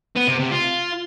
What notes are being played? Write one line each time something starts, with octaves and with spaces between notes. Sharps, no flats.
B3
C3
C3
F4